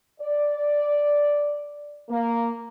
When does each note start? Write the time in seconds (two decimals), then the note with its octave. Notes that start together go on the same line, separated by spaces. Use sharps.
0.21 D5
2.09 A#3